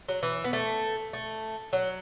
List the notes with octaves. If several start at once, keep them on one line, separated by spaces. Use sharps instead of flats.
F#3
E3
B3
A3
A3
F#3